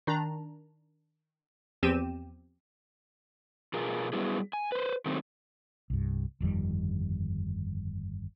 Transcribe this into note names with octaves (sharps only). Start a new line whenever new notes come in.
D#3 D4 A#5
E2 F3 C4 G4 D#7 E7
B2 F4 G#4 A#4
F#3 G3 B3 E4 G#4
G#5
B4 C5
D#3 F#3 A3 C4 D#4
C2 G2
G1 F2 D#3 G3